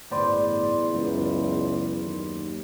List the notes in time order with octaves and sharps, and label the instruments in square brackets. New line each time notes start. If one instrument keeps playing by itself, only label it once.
[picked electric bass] D1 G1 A2 [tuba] E2 [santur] B4 C5 D5
[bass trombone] C#2 [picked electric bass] F#2
[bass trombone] D#2